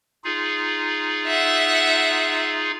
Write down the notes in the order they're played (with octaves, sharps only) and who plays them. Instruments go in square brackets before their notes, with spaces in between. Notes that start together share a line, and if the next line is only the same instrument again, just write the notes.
[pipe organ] D#4 F4 G#4
[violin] E5 F#5